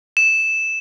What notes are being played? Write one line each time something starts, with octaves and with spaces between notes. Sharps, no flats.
E7